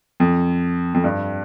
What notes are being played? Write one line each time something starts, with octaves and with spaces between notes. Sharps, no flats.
F2
F2
G2